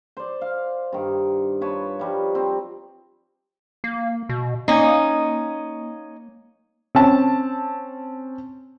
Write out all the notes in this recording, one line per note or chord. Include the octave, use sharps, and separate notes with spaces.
C5 D5
F5
G2 D#3
F4 B4 C#5 A5
F3 G3 D#4
C4
A#3
B2
A#3 C#4 D#4
C4 C#4 A5